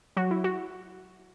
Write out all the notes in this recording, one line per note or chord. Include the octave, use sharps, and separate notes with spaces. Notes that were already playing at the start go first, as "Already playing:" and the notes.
F#3 F#4
E4
F#4